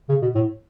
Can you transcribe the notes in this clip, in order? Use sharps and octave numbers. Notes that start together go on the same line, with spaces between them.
C#3
B2
A2